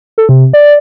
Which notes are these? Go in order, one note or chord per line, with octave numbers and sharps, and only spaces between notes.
A4
C3
D5